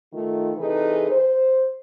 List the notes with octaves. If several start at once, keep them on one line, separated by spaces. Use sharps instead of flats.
D#3 A3 F4
C3 E3 D#4 G#4 A4 B4
C5